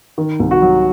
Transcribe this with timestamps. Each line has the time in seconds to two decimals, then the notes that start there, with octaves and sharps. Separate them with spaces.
0.18 D#3
0.39 C2
0.51 F#4
0.62 F#3